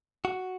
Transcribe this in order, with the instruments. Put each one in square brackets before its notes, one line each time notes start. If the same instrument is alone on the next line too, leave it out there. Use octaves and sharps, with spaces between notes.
[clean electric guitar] F#4